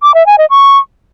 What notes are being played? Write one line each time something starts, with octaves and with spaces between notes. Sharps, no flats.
D6
E5
G#5
D#5
C#6